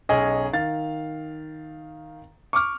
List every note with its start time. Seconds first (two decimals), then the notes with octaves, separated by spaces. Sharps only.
0.09 B1 C#4 G#4 D#5
0.53 D#3 F5 A6
2.53 C#6 D6 F6